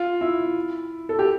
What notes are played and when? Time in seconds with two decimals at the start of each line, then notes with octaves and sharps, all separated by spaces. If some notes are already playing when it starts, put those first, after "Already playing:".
Already playing: F4
0.21 E4
1.09 A4
1.19 G4